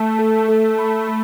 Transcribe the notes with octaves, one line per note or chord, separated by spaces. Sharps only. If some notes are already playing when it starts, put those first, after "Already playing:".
Already playing: A3 A5
A4
A4
B5
B5